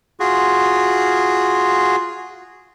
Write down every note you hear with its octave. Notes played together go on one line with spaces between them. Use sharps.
F4 F#4 G#4